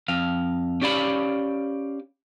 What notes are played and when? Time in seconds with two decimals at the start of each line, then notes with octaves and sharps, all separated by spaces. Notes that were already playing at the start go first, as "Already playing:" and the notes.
0.08 F2 F5
0.81 C#4 G4 D5 F5 B5